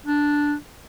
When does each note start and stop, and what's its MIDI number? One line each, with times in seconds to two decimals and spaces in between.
0.07 0.55 62